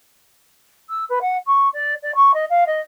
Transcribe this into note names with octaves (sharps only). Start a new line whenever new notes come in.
E6
B4
F#5
C#6
D5
D5
C#6
D#5
F5
D#5